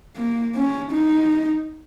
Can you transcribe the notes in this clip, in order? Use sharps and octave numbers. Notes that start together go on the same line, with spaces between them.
A#3
C#4
D#4